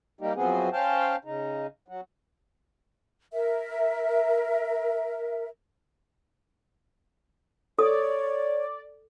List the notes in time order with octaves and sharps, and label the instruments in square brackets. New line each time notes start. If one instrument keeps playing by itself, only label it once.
[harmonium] G3 A#3 D#4 G4
F#2 F3 B3 C4 F#4 G#4
C#4 C5 F5 G5 A5
C#3 D#4
F#3 F#4
[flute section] A#4 E5
[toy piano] A4 D#6 [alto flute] C#5 [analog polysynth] D5